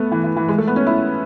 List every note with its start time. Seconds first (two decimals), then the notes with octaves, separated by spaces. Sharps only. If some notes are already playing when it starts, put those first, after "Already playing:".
Already playing: A3 B3
0.12 E3
0.24 E3
0.36 E3
0.49 G#3
0.58 A3
0.67 B3
0.76 C#4
0.87 E4